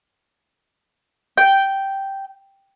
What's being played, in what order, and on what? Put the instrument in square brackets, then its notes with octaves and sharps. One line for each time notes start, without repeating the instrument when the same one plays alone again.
[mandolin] G5